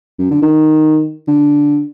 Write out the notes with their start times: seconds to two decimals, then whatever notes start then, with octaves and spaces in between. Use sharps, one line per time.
0.19 F#2
0.31 D3
0.42 D#3
1.28 D3